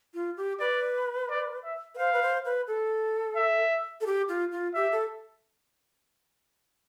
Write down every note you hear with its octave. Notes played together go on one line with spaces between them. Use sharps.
F4
G4
B4 D5
D5
E5
B4
C5 F5
B4
C5
B4
A4
E5
A4
G4
F4
F4
G4 E5
A4